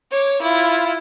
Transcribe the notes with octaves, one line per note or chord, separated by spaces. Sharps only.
C#5 D6
E4 F4